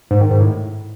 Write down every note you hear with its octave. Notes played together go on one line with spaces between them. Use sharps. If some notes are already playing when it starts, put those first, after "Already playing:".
G#2
D#3
G#2
A2